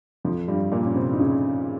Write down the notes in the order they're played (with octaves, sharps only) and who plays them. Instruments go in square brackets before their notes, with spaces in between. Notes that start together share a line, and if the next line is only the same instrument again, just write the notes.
[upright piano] F2 F3
G2 G3
A#2 A#3
C#4
C3 C4
D#4
C#3 C#4